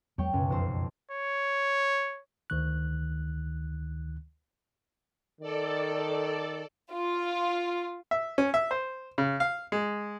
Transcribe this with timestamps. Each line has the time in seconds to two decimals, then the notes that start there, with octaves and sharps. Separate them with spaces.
0.18 E2 F#3 G#3 C#5 G5 C#6
0.33 C#2 F#2 B2 C#4
0.49 B1 F2 C5
1.11 C#5
2.50 D2 D#3 F#6
5.41 D#3 A4 D5
6.91 F4
8.11 E5
8.38 C#4
8.54 E5
8.71 C5
9.18 C#3
9.40 F5
9.72 G#3